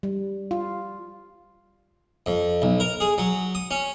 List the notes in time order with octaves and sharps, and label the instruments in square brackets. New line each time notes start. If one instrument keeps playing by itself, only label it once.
[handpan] G3
F4
[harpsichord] F2
B1
A#4
G#4
F#3
D#6
C#4